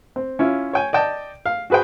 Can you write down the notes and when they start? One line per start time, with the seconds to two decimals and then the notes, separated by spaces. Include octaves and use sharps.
0.16 C4
0.39 C#4 E4 F4
0.73 C#5 G5 G#5
0.93 D5 D#5 G5 A5
1.46 F5
1.70 F#4 G#4 B4 C5 G5